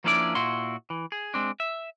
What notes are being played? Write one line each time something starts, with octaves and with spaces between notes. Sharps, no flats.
F3 A#3 C#4 D4 E4 D5
A#2 E4 F#4 C6
E3
G#4
G#3 C4 D4
E5